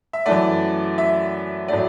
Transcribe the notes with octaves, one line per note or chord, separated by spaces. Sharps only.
E5
F#2 E3 A3 D5
E5
A2 F#3 A3 D5